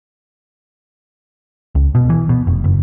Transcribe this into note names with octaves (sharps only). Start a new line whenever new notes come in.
C#2
B2
E3
B2
F1
F#1